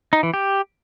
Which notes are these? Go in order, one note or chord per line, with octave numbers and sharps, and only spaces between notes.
D#4
E3
G4